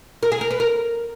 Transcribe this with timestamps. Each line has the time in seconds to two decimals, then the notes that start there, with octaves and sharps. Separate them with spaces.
0.23 A#4
0.32 G#4
0.41 A#4
0.51 B4
0.60 A#4